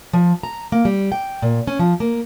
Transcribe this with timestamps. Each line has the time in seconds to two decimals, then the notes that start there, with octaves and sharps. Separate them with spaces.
0.13 F3
0.43 A#5
0.72 A#3
0.85 G3
1.12 G5
1.42 A#2
1.67 C#4
1.79 F3
2.00 A#3